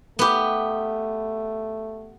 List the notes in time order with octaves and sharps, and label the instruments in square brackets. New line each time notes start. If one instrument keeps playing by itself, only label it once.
[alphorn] A3 [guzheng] B3 G4